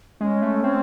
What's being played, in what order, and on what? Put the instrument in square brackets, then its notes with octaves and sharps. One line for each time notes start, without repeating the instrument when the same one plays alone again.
[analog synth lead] G#3 [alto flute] C#4
[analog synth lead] A3
C4